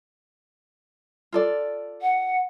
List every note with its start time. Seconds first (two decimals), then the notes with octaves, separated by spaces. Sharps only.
1.32 F4 A4 D5
2.01 F#5